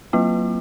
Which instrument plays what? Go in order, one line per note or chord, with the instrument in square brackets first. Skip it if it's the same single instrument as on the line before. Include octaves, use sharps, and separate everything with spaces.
[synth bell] F#3 A#3 F4